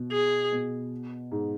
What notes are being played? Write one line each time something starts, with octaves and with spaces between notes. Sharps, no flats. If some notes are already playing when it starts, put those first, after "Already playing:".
Already playing: B2
G#4
B2
G#2